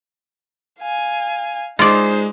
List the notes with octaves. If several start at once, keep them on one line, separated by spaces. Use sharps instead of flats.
F5 G#5
G#3 D#4 F4 C5 D5